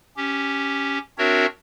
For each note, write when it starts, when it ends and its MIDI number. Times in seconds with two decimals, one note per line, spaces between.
0.17 0.99 61
0.17 0.99 67
1.18 1.46 60
1.18 1.46 62
1.18 1.46 66
1.18 1.46 70
1.18 1.46 73
1.18 1.46 76